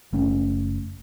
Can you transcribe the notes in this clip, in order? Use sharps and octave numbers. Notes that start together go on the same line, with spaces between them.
F#1 A3 C#4